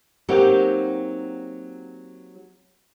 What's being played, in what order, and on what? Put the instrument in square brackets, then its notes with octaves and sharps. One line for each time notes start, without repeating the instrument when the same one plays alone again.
[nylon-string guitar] F#3 A#3 C4 D#4 F#4 G4